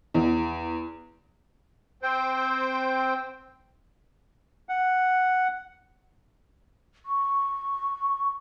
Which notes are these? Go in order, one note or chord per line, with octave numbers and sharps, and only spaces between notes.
E2
C4 C5 G5
F#5
C#6